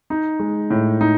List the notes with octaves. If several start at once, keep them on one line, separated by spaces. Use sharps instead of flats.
D#4
G#3
A2
D#4